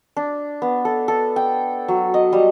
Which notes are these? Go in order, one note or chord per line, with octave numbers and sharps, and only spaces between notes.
D4
B3
A4
A4
G5
F#3
D#5
G3